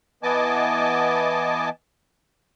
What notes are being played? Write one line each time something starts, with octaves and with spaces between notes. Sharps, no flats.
E3 B3 D#5 G#5 A5 D6